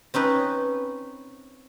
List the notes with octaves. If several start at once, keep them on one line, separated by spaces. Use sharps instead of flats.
C4 C#4 D#4 B4